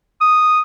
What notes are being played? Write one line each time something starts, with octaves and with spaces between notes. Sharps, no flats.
D#6